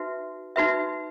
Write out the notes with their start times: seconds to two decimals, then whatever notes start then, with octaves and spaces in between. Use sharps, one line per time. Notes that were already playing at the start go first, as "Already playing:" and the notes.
Already playing: D#4 F#4 B4 E5
0.56 D#4 F#4 B4 E5